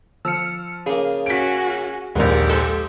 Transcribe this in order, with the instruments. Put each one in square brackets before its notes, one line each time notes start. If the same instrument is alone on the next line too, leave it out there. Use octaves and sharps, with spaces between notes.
[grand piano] F3 [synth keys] E6 F6 C#7
[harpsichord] C#3 A#3 [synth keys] G#4
[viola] C#4 F#4 [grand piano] B6 D7
[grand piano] A#1 G#2 [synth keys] D#2 [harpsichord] D#3 [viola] G4
[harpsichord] G#3 C4 D#4 [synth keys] A4